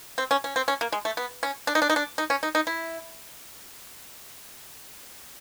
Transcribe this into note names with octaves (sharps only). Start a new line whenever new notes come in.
C4
C#4
C#4
C4
C#4
A#3
G#3
A3
B3
C#4
D4
D#4
D4
D#4
D4
D#4
C#4
D#4
D#4
E4